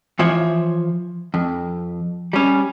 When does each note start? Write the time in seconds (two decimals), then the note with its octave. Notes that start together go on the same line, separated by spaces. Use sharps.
0.19 E3 F3 C#5 E5
1.34 F2
2.33 G3 C#4